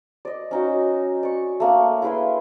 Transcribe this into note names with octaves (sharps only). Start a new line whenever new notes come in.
D5 D#5
C#4 D#4 F#4
D5 C#6
A3 A#3 D4
E4 G#4 B4 C6